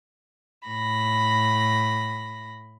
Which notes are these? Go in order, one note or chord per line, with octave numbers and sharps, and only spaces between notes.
A2 B5 A#6